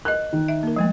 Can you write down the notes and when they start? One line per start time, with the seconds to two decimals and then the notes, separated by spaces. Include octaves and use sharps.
0.05 A#4 D#5 F#6
0.33 D#3
0.48 E5
0.63 A#3 A#4
0.76 F3 G#3 A3